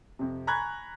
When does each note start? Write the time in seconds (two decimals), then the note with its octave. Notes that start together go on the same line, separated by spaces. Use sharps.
0.19 F2 C3
0.47 G#5 A#5 B5 C#6 F#6 G#6